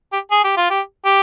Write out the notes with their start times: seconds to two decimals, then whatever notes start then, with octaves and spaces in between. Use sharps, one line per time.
0.13 G4
0.31 G#4
0.44 G4
0.57 F4
0.70 G4
1.05 G4